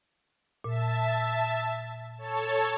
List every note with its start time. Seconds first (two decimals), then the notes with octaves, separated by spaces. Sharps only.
0.64 A#2 E5 A5
2.18 A4 C#5 A5